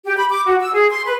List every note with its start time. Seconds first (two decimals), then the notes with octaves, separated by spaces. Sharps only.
0.04 G4
0.17 B5
0.30 D6
0.46 F#4
0.60 E6
0.73 G#4
0.91 C6
1.05 B4